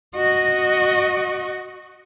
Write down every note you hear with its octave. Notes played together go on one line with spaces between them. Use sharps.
F#4 D#5